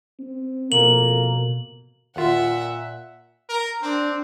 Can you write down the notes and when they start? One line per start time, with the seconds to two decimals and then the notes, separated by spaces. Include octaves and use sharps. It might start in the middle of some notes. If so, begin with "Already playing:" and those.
0.19 C4
0.72 F2 B2 A#3 F#7
2.16 D#2 A#2 F4 E5 F#5
3.49 A#4
3.82 C4 D4